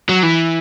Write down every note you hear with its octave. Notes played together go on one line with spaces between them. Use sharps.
F#3
E3